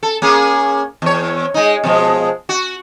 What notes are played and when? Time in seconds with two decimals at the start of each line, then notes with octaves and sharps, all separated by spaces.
0.03 A4
0.22 A#3 C#4 G#4
1.02 E2 C#5
1.54 G#3 D#4
1.84 B2 F3 G#3
2.49 F#4